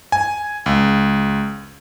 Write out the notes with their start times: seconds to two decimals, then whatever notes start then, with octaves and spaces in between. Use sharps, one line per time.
0.12 G#5
0.66 C#2